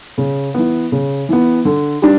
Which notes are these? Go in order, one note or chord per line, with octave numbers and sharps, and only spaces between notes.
C#3
E3 B3
C#3
E3 B3
D3
G3 D4